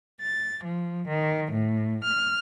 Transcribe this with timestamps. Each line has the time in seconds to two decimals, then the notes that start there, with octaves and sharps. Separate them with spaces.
0.21 A6
0.64 F3
1.08 D#3
1.52 A2
2.04 F6